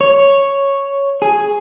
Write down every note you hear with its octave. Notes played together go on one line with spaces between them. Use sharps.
C#5
G#4